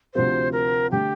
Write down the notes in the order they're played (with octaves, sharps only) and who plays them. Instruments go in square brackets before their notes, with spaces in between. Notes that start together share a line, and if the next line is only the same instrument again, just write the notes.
[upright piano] D2 C3 F3 C4 [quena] C5
[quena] A#4
[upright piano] D3 A3 [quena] G4